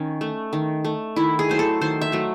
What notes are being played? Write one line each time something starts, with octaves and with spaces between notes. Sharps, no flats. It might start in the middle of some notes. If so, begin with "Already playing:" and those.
Already playing: D#3 C#4
A3
D#3
A3
D#3 E4
G#4
F#3 A3 C5
A4
D#3 C5
E5
F#3 A3